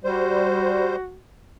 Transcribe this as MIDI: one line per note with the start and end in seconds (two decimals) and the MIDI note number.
0.04 0.96 55
0.04 1.17 66
0.04 0.96 72